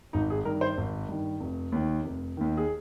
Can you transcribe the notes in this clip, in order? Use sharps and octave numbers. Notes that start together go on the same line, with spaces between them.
G#1 D#4
G#4
G2 D#3 A#4
C5
G#1
G2 D#3
F1
D#2 D#3
F1
D#2 D#3
G#4